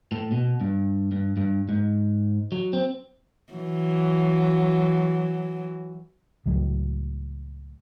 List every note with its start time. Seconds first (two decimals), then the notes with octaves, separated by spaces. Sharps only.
0.12 A2
0.32 B2
0.61 G2
1.12 G2
1.37 G2
1.69 G#2
2.52 F#3
2.73 C4
3.53 E3 F#3
6.46 C#2 A2 F#3